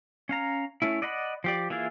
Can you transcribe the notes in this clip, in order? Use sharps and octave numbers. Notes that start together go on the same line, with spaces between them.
C#4 F5 A#5
A3 C#4 E4
D5 D#5 F#5 A#5 B5
F3 G4 D5
E3 A#3 E4 F4 G#4